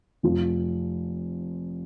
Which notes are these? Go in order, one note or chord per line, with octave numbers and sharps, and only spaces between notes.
F1 F2 F3